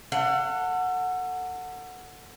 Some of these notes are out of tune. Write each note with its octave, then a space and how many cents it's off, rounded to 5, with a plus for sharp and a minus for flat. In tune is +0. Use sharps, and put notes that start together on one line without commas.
A4 +35 F#5 -10